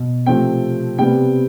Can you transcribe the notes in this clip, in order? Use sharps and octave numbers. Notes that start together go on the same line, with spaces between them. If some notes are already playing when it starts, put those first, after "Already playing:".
Already playing: B2
C3 F3 A3 C4 G5
C3 G3 B3 G5